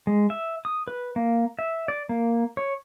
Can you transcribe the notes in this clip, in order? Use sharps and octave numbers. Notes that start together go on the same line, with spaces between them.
G#3
E5
D#6
B4
A#3
E5
D5
A#3
C#5